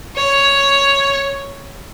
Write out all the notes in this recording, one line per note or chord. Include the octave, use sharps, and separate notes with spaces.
C#5